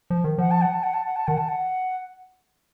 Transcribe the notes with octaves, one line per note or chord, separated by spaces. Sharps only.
F3
D#3
F3 F#5
A5
F#5
A5
F#5
A5
F#5
A5
D#3 F#5
A5
F#5